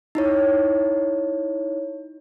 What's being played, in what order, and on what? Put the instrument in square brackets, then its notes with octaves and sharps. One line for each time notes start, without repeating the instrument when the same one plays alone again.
[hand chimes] D#4 E4 C#5